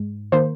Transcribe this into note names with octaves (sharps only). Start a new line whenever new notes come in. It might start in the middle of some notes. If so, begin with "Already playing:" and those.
Already playing: G#2
D#3 A#3 C5